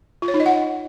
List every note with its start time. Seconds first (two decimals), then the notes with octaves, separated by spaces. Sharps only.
0.22 F4
0.28 C#5
0.34 D#4
0.40 D#5
0.46 F#5